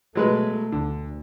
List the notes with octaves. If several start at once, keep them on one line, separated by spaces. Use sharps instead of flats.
B2 F#3 G#3 A3 B4
D2 D3